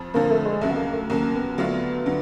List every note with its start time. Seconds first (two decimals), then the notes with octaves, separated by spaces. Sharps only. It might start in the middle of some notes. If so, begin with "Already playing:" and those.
Already playing: F2 F3
0.14 F2 D3 F3 A#3
0.30 A3
0.45 G#3
0.61 D#2 C#3 F#3 A3
0.71 B3
0.77 A#3
0.93 A3
1.10 D#2 C#3 F#3 A#3
1.34 B3
1.58 D3 F#3 A3 D4 F4
2.06 D3 F#3